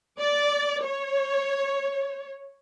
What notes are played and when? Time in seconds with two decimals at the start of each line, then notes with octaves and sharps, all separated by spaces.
0.18 D5
0.82 C#5